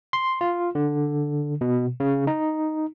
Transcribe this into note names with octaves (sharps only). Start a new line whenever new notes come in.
C6
F4
D3
B2
C#3
D#4